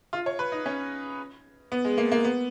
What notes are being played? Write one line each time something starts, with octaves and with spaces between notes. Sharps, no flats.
F4
C#5
B4
D#4
C#4
B3
G#3
A#3
A#3
B3